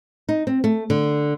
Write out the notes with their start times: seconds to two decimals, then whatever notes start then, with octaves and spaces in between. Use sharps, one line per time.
0.29 D#4
0.47 C4
0.64 A3
0.90 D3